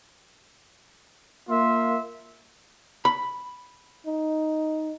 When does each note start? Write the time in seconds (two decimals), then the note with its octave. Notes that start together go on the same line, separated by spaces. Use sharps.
1.49 A#3 F4 E5 C6
3.05 B5
4.06 D#4